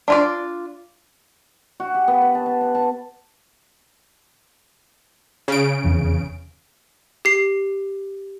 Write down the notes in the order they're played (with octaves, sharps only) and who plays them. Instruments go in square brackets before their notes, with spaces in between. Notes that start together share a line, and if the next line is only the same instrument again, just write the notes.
[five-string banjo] D4 F4 D5
[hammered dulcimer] F#4
G4
B3
B4
A5
A5
F#5
A5
[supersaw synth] C#3 D7
[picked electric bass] F1 E2
[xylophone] G4 C7